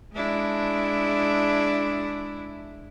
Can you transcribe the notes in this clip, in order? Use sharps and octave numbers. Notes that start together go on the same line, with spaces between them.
G#3 D4 E4